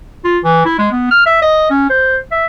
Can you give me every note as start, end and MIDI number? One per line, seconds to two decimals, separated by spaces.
0.24 0.39 65
0.44 0.62 52
0.65 0.77 64
0.78 0.89 56
0.92 1.11 59
1.11 1.26 89
1.26 1.37 76
1.42 1.68 75
1.70 1.87 61
1.90 2.17 72
2.31 2.46 76